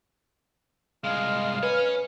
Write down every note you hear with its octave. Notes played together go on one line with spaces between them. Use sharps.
C2 G#3 D#5 F5 F6
B4 C#5 G#5